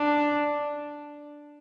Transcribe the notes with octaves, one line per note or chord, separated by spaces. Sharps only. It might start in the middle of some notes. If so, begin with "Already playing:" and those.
Already playing: D4